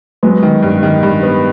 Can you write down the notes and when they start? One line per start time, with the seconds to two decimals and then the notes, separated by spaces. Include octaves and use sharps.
0.23 F#3 G#3 B3
0.43 D#3
0.63 G2
0.83 D#3
1.03 G2
1.23 B3